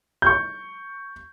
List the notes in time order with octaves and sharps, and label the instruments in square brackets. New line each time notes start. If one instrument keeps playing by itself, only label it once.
[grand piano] C#6 G6